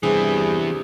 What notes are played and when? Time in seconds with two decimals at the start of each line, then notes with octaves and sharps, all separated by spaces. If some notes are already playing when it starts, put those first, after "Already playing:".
0.03 G2 C3 E3 B3 G#4